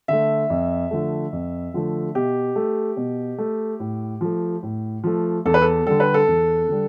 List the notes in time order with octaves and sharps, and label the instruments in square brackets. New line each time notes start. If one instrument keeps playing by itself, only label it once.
[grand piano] D3 A3 E5
F2
D3 F3 A3
F2
D3 F3 A3
B2 G4
A3
B2
A3
A2
F3 A3
A2
F3 A3
E2 A4
B4
A4
D3 G3 A4
B4
A4
E2
D3 G3